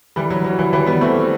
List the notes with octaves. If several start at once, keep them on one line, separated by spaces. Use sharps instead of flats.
E3 G3
F#3
F#3
E3
E3 G3
G3 B3
A3 C4